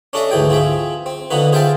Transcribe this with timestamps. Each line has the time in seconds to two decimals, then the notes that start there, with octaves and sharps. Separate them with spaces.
0.13 C#4 D4 A4 D#5 E5
0.31 D2 G#2 E3 G#4 G5
0.49 F3 C4 G#4 E5
1.06 C4
1.31 D3 F3 B3 D#4 B4
1.52 G#4 C5 E5 F5 G5 A5